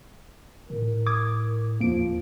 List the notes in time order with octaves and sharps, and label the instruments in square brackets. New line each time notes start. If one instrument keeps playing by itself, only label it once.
[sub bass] A2 [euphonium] A#4
[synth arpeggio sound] D6 D#6 G#6
[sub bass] D#2 [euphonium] F3 [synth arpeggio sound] A#3 D7